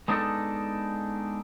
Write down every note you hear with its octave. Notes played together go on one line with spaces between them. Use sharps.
G#3 B3 D4 D#4 G4 A4